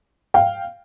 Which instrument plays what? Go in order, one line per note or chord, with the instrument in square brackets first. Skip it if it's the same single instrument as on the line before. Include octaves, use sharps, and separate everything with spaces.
[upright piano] F5 G5